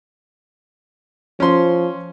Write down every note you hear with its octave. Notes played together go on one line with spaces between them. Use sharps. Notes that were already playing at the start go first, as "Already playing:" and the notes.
F3 C#4 C6